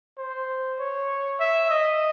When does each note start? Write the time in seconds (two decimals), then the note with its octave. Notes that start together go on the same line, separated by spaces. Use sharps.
0.18 C5
0.80 C#5
1.40 E5
1.71 D#5